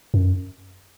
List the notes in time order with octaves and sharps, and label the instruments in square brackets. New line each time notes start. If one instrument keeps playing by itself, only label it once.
[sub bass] F#2